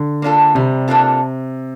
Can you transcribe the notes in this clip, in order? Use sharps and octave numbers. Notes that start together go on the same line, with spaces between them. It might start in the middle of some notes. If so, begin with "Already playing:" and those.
Already playing: D3
A#3 D4 F4 A4
C3 G3
A#3 D4 F4 A4